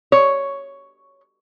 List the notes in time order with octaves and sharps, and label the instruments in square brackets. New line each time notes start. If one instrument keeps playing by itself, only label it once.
[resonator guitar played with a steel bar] C#5